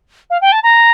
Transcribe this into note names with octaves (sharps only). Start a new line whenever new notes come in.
F5
G5
A5
A#5